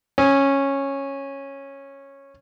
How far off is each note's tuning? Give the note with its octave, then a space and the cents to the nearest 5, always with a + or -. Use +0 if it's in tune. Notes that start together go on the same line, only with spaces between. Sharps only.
C#4 -10 D#6 +35